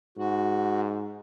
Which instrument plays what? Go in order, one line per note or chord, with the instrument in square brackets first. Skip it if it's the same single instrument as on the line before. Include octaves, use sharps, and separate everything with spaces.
[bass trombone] G#2 [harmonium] F#4